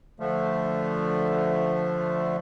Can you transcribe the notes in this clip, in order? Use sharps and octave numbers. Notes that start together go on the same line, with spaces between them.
D3 F3 A3